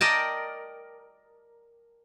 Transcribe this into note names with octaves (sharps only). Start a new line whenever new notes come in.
A#4 D5 D#5 G5 A5